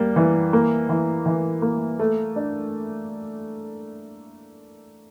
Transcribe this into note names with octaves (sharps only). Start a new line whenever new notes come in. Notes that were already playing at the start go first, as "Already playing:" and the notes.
Already playing: G3 A#3
E3
A#3
E3
E3
A#3
A3
D4